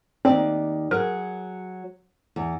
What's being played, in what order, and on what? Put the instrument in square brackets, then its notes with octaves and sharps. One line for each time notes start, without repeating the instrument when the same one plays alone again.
[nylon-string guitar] D#2 D#4 D5 [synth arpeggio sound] C4
[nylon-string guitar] F#3 G#4 [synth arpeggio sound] A#4
[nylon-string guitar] E2